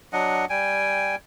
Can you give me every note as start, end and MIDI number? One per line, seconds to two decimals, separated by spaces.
0.13 0.45 54
0.13 0.45 62
0.13 0.45 75
0.13 0.45 78
0.50 1.16 55
0.50 1.16 79
0.50 1.16 80